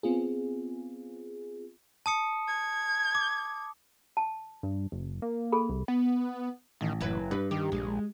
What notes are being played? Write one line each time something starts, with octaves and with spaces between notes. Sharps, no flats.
B3 C4 F4 G#4
A5 D#6 C#7
G#6
D6
A5
G2
F#1
A#3
G#4 A4 B5
C2
B3
A1 D#3
F#1 F#3 E4 B4
G2 B4
D#3 G4
A#1 G#3